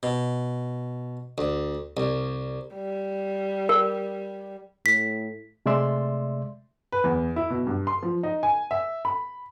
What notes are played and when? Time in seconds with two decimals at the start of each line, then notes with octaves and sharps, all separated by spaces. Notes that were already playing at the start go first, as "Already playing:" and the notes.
0.03 B2
1.38 D2
1.97 C2
2.75 G3
3.69 A#4
4.86 A2 B6
5.66 C3 G#3 A3 D5 E5 C6
6.92 B4
7.04 E2
7.36 E4
7.50 B2
7.67 G2
7.87 C6
8.03 F3
8.23 D#4
8.43 G#5
8.71 E5
9.05 B5